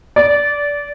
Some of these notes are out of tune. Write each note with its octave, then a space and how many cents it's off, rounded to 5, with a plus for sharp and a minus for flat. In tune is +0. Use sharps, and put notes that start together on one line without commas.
D5 -20